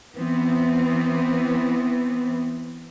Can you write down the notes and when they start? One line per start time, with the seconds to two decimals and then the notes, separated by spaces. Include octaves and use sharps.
0.15 E3 B3 C4